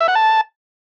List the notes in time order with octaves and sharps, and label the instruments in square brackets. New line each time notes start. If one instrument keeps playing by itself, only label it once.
[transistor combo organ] E5
F#5
A5